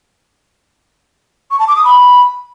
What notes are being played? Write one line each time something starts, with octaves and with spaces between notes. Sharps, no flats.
C#6
A5
D6
D#6
B5